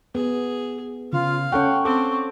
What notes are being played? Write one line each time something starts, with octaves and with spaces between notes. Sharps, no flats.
B3 G#4
C#3 F4 F5
C#4 A4 F#5 G5 C#6
C4 A4 D6